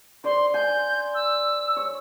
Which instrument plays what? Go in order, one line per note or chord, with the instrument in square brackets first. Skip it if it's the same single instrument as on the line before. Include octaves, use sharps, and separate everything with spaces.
[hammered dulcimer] C5 D5 [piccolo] C6
[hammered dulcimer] G#5 [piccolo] G6
[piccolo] E6
[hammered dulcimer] C#5